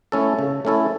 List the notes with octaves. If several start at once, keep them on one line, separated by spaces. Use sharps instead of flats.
A3 C#4 E4 A4
C#3
A3 C#4 E4 A4